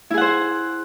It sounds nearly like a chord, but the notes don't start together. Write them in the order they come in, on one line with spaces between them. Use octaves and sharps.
E4 G#4 F#5 C5